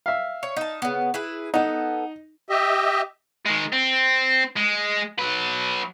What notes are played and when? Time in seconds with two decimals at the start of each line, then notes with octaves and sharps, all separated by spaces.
0.06 E5 F5
0.43 C#5
0.57 D#4 A5
0.82 C#3 B3
1.14 E4 G#4 B4
1.54 B3 D#4 A4
2.48 G4 D#5 E5
3.46 D#3 G#3
3.73 C4
4.57 G#3
5.19 F#3 B4